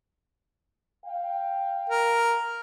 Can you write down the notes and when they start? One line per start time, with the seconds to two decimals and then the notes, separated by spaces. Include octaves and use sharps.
1.05 F5 G5
1.89 A#4